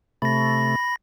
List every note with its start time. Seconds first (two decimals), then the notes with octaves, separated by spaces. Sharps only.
0.22 C3 A3 B5 A#6